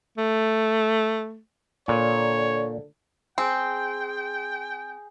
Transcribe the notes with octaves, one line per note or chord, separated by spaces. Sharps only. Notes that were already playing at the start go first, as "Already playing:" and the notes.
A3
A#2 D3 C#5
C4 G#4 G5